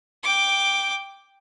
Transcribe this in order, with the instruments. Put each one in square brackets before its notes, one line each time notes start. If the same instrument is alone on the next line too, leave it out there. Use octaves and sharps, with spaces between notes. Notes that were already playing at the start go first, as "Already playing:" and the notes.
[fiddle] G5 D6